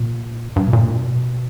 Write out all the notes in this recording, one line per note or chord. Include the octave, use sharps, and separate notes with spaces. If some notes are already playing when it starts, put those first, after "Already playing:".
Already playing: A#2
G2
B2
A#2
B2